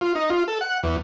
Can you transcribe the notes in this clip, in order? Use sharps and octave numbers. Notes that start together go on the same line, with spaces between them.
F4
D#4
F4
A4
F#5
E2